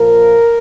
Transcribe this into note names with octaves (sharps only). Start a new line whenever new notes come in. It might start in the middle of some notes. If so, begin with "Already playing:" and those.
Already playing: A#2 F3 A#3 A#4